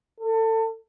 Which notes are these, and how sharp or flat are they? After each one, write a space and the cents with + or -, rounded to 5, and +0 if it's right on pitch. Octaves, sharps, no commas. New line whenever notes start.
A4 +25